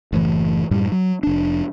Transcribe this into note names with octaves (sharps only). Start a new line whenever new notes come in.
F#1 A2 E3
F#2 A2 G3
F#3
F1 D4